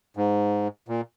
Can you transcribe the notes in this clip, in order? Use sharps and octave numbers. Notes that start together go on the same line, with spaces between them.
G#2
A#2